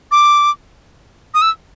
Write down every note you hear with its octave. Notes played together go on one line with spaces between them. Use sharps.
D6
D#6
E6